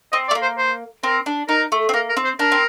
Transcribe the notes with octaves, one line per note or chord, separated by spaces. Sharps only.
C4 D#5
A3 D5
A#3
C5
C5
C4 A#4
D4
D#4 A#4
A3
C4
A#3 A#4
A#4
C4
C5
D4 A#4
C4